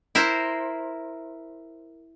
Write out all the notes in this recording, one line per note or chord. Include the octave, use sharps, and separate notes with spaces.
E4 A#4 C5